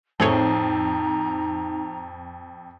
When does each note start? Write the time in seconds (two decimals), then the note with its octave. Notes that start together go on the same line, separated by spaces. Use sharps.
0.20 F2 A2 C4 D#4 G#4 C#5 A#5